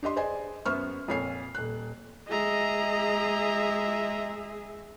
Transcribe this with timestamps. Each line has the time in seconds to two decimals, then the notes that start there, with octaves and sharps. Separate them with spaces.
0.03 D4 G4 D#5 C6
0.16 G#4 B4 C5 D5 D#5 G#5
0.66 F#2 B3 C5 E5 C#6 F6
1.08 F2 A#2 C#5 G#5 C7
1.54 D#1 F#6
2.28 G#3 G#4 D#5 E5 A#5